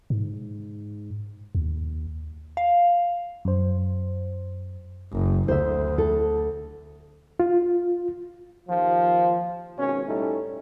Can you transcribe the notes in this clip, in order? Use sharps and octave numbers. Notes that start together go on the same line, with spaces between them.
G#2
D#2
F5
F#2 C5
F#1
D2 C5 E5
A4
F4
D#2 F3
G#1 B2 C#4
A2 G3 A3 C#4 D#4